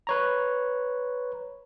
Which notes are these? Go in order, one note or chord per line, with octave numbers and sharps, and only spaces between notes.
B4 C#5 A#5